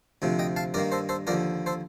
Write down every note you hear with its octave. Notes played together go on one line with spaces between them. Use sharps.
D2 C3 F3
D#5 G5
F5 A5
G2 D#3 A#3 A#4 D5
A4 C5
A4 C5
D#2 D3 F3 A#4 D5
A4 C5